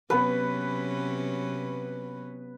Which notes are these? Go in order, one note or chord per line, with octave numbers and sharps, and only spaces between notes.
C3 F#3 B3 C#4 B4